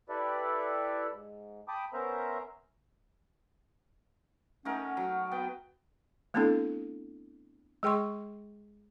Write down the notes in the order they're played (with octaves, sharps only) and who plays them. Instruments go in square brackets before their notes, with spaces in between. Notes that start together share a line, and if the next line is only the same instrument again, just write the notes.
[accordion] E4 G4 A4 B4 D5 E5
G#2
G5 A5 B5 D6 D#6
B3 C#4 A#4 C5 E5 A#5
[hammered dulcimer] A3 D#4 A#4 [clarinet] C#4 [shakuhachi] F#5
[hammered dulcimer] F#3
[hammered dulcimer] B3 [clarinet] G5
[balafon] A3 B3 C4 D4 E4 A4
G#3 G#4 G5 C6 C#6